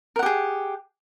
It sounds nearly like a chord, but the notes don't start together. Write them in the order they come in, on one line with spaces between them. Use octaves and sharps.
A#4 F#5 G4 G#4